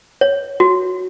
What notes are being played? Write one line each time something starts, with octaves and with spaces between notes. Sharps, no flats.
C#5
F#4